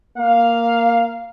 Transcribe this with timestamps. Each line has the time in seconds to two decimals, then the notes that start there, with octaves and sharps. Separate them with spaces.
0.18 A#3 F5